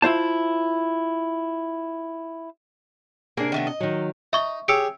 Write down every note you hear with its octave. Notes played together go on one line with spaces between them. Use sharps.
E4 F4 C5 A5
C3 A#3 D4 G#4 A#4
D#3 A3 B3
D#5
D#3 F#3
D#4 E5 C#6 G7
G4 G#4 C#5 E6 C#7 D7